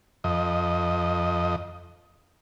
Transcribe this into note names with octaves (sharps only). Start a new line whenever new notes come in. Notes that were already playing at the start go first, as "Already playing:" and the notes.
F2 D#5